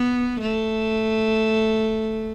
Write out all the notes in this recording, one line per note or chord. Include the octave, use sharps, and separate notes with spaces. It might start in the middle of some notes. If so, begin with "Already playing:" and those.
Already playing: B3
A3